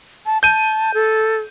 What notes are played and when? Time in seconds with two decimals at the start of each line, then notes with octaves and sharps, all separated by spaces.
0.26 A5
0.43 A5 G6 D#7
0.94 A4